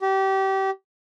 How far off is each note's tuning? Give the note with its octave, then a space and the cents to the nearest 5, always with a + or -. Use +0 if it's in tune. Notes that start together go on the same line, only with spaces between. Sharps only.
G4 -30